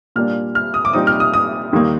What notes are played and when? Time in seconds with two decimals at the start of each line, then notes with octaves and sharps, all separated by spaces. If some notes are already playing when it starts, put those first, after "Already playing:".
0.16 A#2 G3 A#3 D4 F6
0.55 F6
0.74 D#6
0.85 D6
0.93 A#2 G3 C4 D#4 D#6
1.07 F6
1.20 D#6
1.34 D#6
1.73 D#2 D#3 G3 A#3